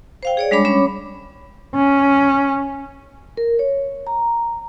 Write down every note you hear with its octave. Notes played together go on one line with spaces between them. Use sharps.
C5 F5 G5
G#4 C#5 D5
G3 G#3 D4 C#5 B5 D6
G3 C#4 C#5 B5 D6
C#4
A#4
C#5
A#5